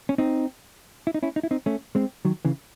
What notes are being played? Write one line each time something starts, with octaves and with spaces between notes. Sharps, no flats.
C#4
C4 D#4
E4
D#4
C#4 E4
D#4
E4
C4 D#4
A3 C#4
G#3 C4
D#3 F#3
C#3 E3